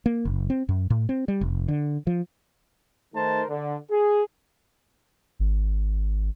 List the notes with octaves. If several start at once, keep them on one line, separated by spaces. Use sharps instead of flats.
A#3
F#1
C4
F#2
A2
C4
G3
F1
D3
F3
D#3 A3 D#4 A#4 C5 A5
D3
G#4
G#1